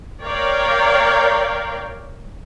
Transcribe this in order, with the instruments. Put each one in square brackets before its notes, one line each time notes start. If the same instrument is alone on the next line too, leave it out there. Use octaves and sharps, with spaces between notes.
[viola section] A#4 C#5 D5 F5 G5